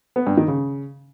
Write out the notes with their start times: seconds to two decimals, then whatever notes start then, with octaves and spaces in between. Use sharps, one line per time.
0.16 B3
0.27 G2
0.37 D#3
0.48 C#3